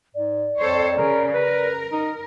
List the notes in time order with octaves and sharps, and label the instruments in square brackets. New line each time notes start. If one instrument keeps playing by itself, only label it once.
[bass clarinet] G#2 [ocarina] D5
[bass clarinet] F2 [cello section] A4 C5 C#5
[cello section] C#3 [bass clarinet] A#4
[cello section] A#4 [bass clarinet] B4
[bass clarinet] D#4